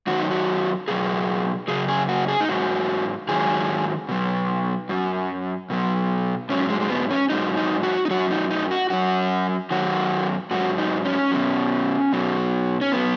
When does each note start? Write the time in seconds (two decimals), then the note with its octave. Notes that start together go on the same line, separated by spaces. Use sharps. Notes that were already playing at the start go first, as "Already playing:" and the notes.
0.07 F#2 D#3 F#3 F#4
0.20 D#4
0.31 F#4
0.88 B2 F#3 G#4
1.68 F#2 C#3 F#3 G#4
1.88 G#4
2.09 F#4
2.28 G#4
2.40 D#4
2.49 G#2 F#3 F#4
3.28 G#2 D#3 F#3 G#4
4.09 B2 F#3
4.89 F#2 F#3
5.70 B2 F#3
6.49 G#2 F#3 C#4
6.70 G#3
6.80 G#3
6.90 B3
7.11 C#4
7.30 G#2 F#3 D#4
7.57 D#4
7.83 F#4
8.05 D#4
8.10 F#2 F#3 F#4
8.31 D#4
8.51 D#4
8.71 F#4
8.90 F#2 F#3 F#4
9.70 F#2 D#3 F#3 F#4
10.51 G#2 F#3 F#4
10.78 D#4
11.05 C#4
11.31 B2 F#3
12.13 B2 F#3
12.81 C#4
12.92 F#3 B3